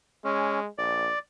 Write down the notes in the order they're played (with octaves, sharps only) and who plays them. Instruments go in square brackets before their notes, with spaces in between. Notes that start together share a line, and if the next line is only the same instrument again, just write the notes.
[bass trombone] G#3 [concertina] C#4
[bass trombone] A#1 [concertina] D5